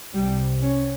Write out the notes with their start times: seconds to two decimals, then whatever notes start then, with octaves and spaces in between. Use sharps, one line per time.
0.14 C2 C3 G3
0.61 C#4